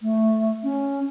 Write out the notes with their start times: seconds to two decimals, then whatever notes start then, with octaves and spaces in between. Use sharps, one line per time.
0.01 A3
0.63 C#4